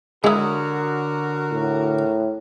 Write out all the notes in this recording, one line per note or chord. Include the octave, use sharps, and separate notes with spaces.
D3 G#3 E4 F#4 A#4 C#5 D#6
A2